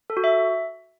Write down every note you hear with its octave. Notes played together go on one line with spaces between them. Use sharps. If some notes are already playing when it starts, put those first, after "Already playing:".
A4
F#4
E5